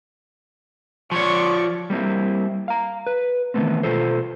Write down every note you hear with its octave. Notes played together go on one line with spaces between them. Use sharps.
F3 C#5 D5 C#6
G3 A#3 C4 E4
F5 A#5
B4
D#3 E3 F#3 A3 B3 C4
B2 F4 A4 C5